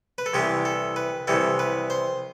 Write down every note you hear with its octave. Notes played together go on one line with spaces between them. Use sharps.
B4
A4
C2 C3 E3 G3 G4
A4
B4
C2 C3 E3 G3 A4
B4
C5